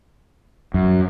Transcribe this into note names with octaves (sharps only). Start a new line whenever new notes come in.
F#2